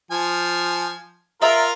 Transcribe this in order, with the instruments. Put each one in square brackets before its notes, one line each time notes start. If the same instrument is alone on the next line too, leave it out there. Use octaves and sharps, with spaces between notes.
[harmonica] F3 G#5
[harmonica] F4 A#4 [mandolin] D5 E5 A#5